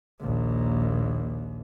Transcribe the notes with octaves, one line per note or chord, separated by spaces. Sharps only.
A#1 D#2